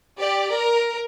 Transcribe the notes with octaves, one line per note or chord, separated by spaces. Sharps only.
G4 D5
A#4